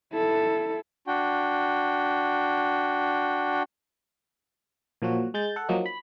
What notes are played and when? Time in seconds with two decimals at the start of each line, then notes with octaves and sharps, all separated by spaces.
0.13 E4 A4
1.07 D4 F#4 G5
5.02 A#2 F3 F#3 F#4
5.34 G#3 G6 A6
5.56 A4 F#5
5.69 F3 F#3 A#3 D#4
5.86 B5